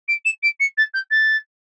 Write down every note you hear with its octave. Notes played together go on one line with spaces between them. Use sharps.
D7
E7
D7
C#7
A6
G6
A6